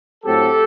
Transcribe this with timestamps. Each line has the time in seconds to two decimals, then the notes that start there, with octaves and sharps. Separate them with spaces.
0.24 A2 F#3 A3 C4 G4 A4